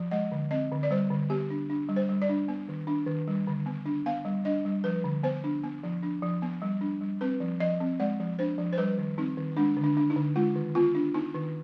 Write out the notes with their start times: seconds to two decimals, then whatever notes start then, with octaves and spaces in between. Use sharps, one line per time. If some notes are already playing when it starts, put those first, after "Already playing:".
Already playing: F3
0.11 G#3 D#5
0.32 D3
0.51 C4 D#5
0.72 D3
0.83 D5
0.91 G3 C5
1.11 D3
1.30 B3 G4
1.50 D4
1.70 D4
1.89 G3
1.96 C5
2.09 G3
2.22 D5
2.29 D4
2.48 B3
2.69 D#3
2.87 D4
3.07 D#3
3.28 G3
3.47 D3
3.66 B3
3.85 D4
4.06 B3 F5
4.25 G3
4.45 D4 D#5
4.65 G3
4.84 F3 B4
5.04 D3
5.23 B3 C5
5.44 D4
5.63 B3
5.84 F3
6.03 D4
6.22 F3
6.42 B3
6.62 G3
6.81 D4
7.01 G3
7.21 C4 B4
7.40 F3
7.60 F3 D#5
7.80 C4
8.00 G#3 D5
8.20 F3
8.39 D4 C5
8.58 F3
8.73 C5
8.78 G3 B4
8.98 D#3
9.18 C4 D#4
9.37 D#3
9.57 G#3 D4
9.77 D3
9.84 D4
9.97 D4
10.10 D#4
10.16 D3
10.36 G#3 F4
10.56 D#3
10.75 B3 F4
10.95 D4
11.14 B3 D#4
11.34 D#3